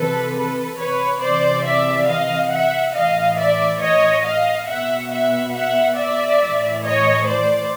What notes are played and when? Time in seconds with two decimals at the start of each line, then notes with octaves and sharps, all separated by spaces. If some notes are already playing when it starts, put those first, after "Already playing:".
Already playing: C3 E3 A4 B4
0.35 A4 B4
0.78 B4 C#5
1.21 C3 E3 C5 D5
1.65 D5 E5
2.08 D#5 F5
2.51 E5 F#5
2.93 A2 E3 D#5 F5
3.37 D5 E5
3.80 C#5 D#5
4.24 D#5 F5
4.66 B2 E5 F#5
5.10 E5 F#5
5.54 E5 F#5
5.96 D5 E5
6.40 A2 E3
6.83 C#5 D#5
7.25 C5 D5